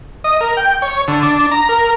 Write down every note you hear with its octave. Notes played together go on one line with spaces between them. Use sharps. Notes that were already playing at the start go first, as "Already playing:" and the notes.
D#5
A#4
G5
C#5
D3
D4
A#5
A#4